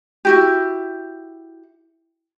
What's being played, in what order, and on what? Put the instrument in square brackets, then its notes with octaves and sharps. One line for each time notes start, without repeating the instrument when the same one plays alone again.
[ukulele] E4 F#4 G4